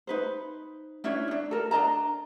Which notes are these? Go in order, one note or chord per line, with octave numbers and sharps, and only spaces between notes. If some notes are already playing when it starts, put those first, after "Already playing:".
D#4 B4 C5
C#4 D4 E4 C#5
D4 D#4
A4 A#4
D4 D#5 A5 A#5